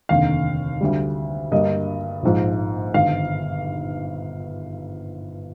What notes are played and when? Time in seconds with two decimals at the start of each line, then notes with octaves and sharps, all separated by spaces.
0.09 F1 D#2 D3 F5
0.81 D2 D3 G3
1.51 G2 D3 G3 A#3 D#5
2.23 A#1 G#2 F3
2.94 G1 G2 D#3 F5